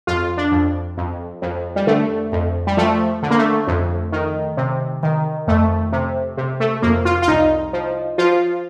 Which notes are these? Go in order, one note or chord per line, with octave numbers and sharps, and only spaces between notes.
F2 F4
D4
F2
F2
F2
G3
D3 A3
F2
G3
F3 A3
D3
A#3
A3
F2
D#3
C3
D#3
F2 A3
C3
C3
A3
F2 A#3
F4
F4
C2 D#4
F3
F3 F4